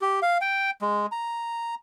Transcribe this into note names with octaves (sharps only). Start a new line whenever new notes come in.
G4
F5
G5
G#3
A#5